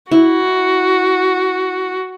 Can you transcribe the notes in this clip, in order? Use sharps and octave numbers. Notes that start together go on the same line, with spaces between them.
E4 F#4